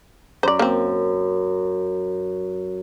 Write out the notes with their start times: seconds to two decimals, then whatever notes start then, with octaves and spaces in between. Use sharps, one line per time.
0.43 F#2 C5 D5
0.59 A#3 C4